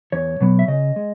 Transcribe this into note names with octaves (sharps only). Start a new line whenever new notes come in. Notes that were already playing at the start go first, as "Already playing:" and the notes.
E2 C#5
B2 F#3 B3
E5
C#3 D#5
G#3